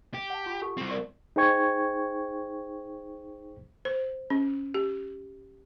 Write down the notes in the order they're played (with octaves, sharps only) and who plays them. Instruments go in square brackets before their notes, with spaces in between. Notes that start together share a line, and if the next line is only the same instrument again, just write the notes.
[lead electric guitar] G4
[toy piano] F#5 A5
F4 C6
G4 A4 G#5
[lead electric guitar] G3 C4
[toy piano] A#4 D5 C6
[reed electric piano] D#4 G#4 C5 G5 C#6 G#6
[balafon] C5
C#4
G4